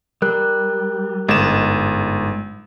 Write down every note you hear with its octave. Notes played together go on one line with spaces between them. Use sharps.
G3 A#4 F#6
G1 G#2 G#3 E7